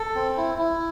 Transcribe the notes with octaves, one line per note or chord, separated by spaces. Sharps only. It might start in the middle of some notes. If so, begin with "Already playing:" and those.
Already playing: A4
C4
E4
E4